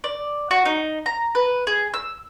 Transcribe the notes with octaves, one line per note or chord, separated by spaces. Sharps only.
D5
F#4
D#4
A#5
B4
G#4
E6